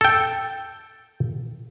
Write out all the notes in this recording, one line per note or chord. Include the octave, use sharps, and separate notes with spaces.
A4 G5